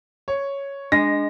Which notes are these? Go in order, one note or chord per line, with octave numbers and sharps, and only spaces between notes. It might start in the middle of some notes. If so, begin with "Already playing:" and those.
C#5
G#3 D4 A#6